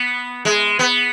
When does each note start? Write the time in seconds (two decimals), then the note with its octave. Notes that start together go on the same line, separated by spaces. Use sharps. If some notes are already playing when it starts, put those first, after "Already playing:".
Already playing: B3
0.45 G#3
0.79 B3